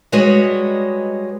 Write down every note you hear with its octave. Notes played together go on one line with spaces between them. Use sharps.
G3 G#3 F#4 B4 C#5 D#5